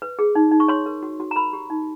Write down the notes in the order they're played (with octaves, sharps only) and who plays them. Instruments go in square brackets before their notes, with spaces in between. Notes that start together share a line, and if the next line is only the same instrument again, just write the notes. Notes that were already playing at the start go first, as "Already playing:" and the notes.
[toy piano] B4
G#4
D#4
D#4
C#6
C#5 C6
A#4
F#4
F#4
A#5
A#4 B5
G4
D#4